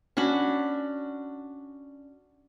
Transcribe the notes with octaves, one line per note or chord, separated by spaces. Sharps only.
C#4 D4 F#4 B5